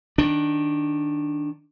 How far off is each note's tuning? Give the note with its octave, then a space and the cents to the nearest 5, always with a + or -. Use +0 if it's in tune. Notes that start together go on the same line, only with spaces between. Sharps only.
D#3 +0 D4 +0